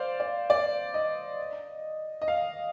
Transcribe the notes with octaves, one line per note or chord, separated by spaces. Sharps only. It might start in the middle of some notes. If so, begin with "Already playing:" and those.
Already playing: C5 D5 F5
D5
D5
D#5
D#5
F5